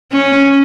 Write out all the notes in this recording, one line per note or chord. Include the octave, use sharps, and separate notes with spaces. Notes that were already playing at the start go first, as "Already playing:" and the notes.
C#4